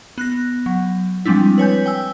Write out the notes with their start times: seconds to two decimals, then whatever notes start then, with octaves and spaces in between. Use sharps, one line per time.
0.18 B3 F#6 A#6
0.66 F#3
1.26 F3 G3 G#3 C4 D4 E4
1.58 B4 C#5 G#5 G6
1.86 G5 G#5 E6